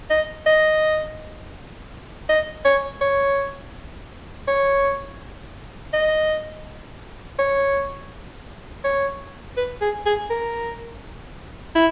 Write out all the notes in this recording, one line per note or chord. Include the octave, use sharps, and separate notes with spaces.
D#5
D#5
D#5
C#5
C#5
C#5
D#5
C#5
C#5
B4
G#4
G#4
A#4
E4